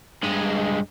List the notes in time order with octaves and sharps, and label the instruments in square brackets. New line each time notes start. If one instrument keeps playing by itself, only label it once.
[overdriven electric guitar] G2 G#3